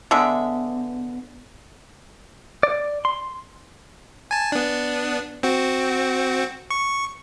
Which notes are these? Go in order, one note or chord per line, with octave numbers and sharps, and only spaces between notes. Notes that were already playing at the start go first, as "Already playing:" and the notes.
D3 G#3 B3 E5
D5
C6
G#5 A5
B3 D4
C4 F#4
C#6